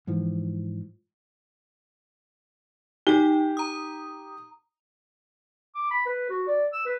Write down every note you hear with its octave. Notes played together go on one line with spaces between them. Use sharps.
G#2 E3 F3
D#4 G4 G5 G7
A#5 D#6
D6
B5
B4
F#4
D5
E6
B4